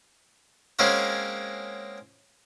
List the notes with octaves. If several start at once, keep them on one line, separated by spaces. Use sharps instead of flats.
G#3 A#3 C4 C#4 F#4